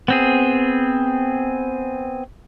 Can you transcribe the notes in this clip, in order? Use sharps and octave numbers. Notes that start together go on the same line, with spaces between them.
B3 C4 G#4